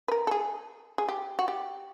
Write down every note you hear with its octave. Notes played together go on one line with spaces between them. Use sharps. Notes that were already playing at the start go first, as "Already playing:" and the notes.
B4
A#4
A4
G#4
G#4
G4
F#4
G4